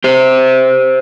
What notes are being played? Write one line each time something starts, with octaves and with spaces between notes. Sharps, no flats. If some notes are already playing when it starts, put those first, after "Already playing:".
G4 C5